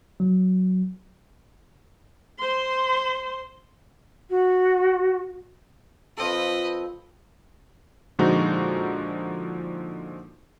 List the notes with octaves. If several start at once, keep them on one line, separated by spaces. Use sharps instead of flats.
F#3
C5 C6
F#4
F3 C4 A4 B4 D#5
A#2 D3 F3 G#3 D#4 F#4